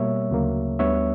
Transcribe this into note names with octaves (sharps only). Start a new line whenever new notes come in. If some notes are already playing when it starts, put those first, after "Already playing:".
Already playing: B2 G3 A#3 C#5 E5
D2 C#3 F#3 A#3
D2 D3 G3 B3 C#5 E5